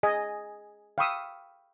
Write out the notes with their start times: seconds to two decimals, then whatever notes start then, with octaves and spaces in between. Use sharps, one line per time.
0.03 G#4 D#5 G#5
0.98 F5 G5 B5 C#6 D#6 E6